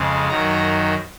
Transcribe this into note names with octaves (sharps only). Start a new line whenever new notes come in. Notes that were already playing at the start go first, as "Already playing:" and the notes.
Already playing: F2 C#3 G#3
F#2 D#3 F#3 A#5